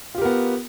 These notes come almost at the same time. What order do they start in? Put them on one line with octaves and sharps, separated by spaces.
F4 G4 A#4 B3